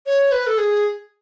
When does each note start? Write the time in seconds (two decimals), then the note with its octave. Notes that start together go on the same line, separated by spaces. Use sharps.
0.06 C#5
0.32 B4
0.47 A4
0.58 G#4